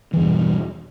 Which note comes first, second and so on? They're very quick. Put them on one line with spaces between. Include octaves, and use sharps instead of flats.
E3 E2 G2 B2